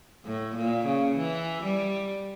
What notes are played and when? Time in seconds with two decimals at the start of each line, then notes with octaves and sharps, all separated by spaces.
0.25 A2
0.56 A#2
0.87 C#3
1.17 E3
1.63 G3